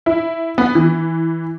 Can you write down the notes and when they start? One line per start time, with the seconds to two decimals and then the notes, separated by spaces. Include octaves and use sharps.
0.06 E4
0.58 B3
0.75 E3